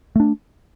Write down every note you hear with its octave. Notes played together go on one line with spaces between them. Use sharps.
A3 D4